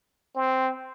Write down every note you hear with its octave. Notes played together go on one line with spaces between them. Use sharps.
C4